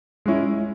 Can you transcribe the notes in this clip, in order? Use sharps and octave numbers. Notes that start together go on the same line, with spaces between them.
G#3 C#4 E4